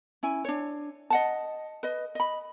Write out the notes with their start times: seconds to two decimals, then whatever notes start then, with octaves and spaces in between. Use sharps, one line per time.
0.23 C#4 E4 G#5
0.44 D4 C#5
1.10 D#5 F#5 A5
1.83 B4 D#5
2.15 D#5 B5